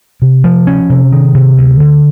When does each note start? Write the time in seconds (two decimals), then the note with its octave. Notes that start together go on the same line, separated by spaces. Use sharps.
0.22 C3
0.44 F3
0.67 C#4
0.90 C3
1.12 D#3
1.34 C3
1.58 D2
1.80 D3